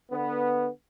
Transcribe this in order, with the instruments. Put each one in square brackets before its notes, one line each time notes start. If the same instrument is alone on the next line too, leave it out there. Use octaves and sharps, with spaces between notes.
[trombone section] D3 B3